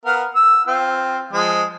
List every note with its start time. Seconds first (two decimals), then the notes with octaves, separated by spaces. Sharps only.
0.06 B3 A#4 F5
0.35 E6
0.68 C4 F4
1.33 F3 G#3 D#6